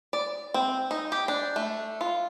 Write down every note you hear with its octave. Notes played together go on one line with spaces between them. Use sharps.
D5
C4
D#4
G4
D4
A3
F4